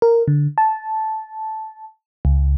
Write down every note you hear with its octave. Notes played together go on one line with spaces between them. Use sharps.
A#4
D3
A5
C#2